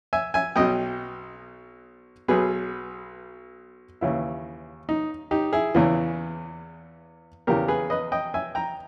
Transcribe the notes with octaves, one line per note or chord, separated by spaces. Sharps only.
E5 G#5
E5 G#5
B1 B2 D#5 G5
B1 B2 G#4 B4
D#2 C#3 E3 E4
D#4
D#4 G4
E4 G#4
E2 C#3 E3
E2 C#3 E3 G4 A#4
G#4 B4
B4 D#5
D#5 G5
E5 G#5
G5 A#5